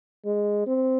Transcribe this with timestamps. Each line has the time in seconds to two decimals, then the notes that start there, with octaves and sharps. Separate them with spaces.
0.25 G#3
0.67 C4